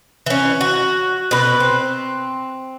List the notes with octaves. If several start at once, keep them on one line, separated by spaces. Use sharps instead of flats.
E3 C#4
F#4
B2 B4
C4